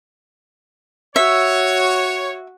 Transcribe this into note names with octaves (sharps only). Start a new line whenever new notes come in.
F#4 C#5 E5